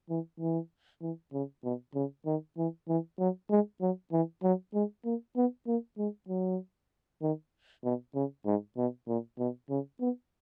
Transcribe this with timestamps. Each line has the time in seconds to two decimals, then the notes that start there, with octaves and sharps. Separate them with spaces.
0.09 E3
0.40 E3
1.02 E3
1.33 C#3
1.64 B2
1.95 C#3
2.26 D#3
2.57 E3
2.88 E3
3.19 F#3
3.50 G#3
3.81 F#3
4.12 E3
4.43 F#3
4.74 G#3
5.05 A#3
5.36 B3
5.67 A#3
5.98 G#3
6.29 F#3
7.22 D#3
7.84 B2
8.15 C#3
8.46 G#2
8.77 B2
9.08 A#2
9.39 B2
9.70 C#3
10.01 B3